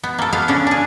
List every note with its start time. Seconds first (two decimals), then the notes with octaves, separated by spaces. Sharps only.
0.03 B3
0.18 A#3 A4
0.33 B3 F5
0.48 C#3 C#4 D4
0.67 D4 G#4